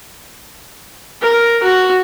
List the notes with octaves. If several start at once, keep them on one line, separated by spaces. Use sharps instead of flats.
A#4
F#4